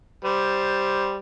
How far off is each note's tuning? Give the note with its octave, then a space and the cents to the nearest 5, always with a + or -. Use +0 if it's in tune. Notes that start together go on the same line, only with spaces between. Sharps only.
G3 +0 C5 +0